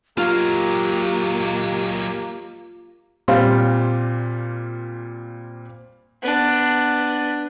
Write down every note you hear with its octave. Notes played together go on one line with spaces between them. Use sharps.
F#3 G#3 A#3 F4 G4
A#2 G3 C4 F4
B3 D4